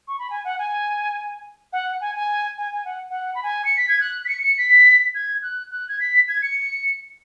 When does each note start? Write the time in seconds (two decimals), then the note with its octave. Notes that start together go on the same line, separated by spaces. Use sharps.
0.08 C#6
0.19 B5
0.30 G#5
0.45 F#5
0.59 G#5
1.73 F#5
2.01 G#5
2.15 G#5
2.58 G#5
2.72 G#5
2.85 F#5
3.10 F#5
3.35 B5
3.43 G#5
3.65 C#7
3.77 B6
3.88 G#6
4.00 F#6
4.25 B6
4.29 C#7
4.43 C#7
4.58 B6
5.14 G#6
5.42 F#6
5.71 F#6
5.89 G#6
6.00 B6
6.28 G#6
6.42 C#7